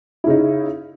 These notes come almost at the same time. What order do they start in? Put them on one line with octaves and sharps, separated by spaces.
E4 C#3 D#4